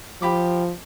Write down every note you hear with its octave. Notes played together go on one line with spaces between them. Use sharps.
F3 G4 B5 D6